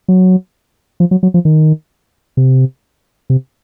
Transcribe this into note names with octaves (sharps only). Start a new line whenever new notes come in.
F#3
F3
F#3
F#3
F3
D#3
C3
C3